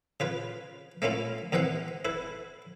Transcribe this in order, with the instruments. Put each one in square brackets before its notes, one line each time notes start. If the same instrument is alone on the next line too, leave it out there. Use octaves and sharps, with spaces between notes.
[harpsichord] C#3 F4 B4
A3 A#3 C#4 E4 F4
D#2 C3 E3 E5 F#5 C6
E4 A4 B4